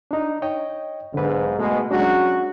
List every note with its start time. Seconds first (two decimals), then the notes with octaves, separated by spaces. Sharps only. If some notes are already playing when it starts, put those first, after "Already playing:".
0.11 D4 D#4
0.42 C#5 D#5 G5
1.14 B1 G#2 D3 B4
1.59 B2 G#3 A3
1.91 F#3 G#3 C#4 D4 F#4